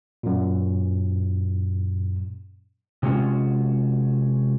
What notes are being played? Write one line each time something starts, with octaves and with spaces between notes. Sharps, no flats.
F#2 A#2
C3 F#3 G#3 C#4 F4 F#4